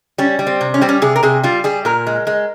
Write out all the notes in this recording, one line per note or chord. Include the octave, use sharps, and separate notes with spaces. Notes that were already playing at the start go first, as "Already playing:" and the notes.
G3 C#4
G3
C4
C3
C#4
G3 C4
C#4
C3 G#4
A#4
C3 G#4
G3 F4
G3 G#4
A#2 A#4
G#3
G#3